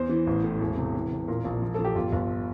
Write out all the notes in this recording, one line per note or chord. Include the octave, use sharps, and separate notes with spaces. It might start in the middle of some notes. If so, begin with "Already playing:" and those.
Already playing: E2 C5
E3
A1
A2
E1
C3
E3
C3
A#2 A#4
A#1
F3
F3 A4
G4
G1 F4
G1